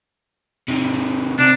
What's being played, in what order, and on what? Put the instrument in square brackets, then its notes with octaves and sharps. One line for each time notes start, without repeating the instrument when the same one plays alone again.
[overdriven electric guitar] C3 D#3
[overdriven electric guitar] C3 [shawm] D4